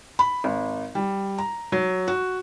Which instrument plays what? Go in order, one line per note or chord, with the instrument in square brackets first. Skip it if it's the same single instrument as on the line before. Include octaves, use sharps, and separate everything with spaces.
[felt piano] B5
G#1
G3
A#5
F#3
F#4